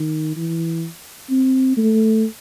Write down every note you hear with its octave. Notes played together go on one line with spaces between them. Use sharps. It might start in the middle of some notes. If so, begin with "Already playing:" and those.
Already playing: D#3
E3
C4
A3